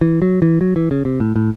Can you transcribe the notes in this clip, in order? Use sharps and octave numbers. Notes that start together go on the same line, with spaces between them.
E3
F#3
E3
F#3
E3
C#3
C3
A2
A2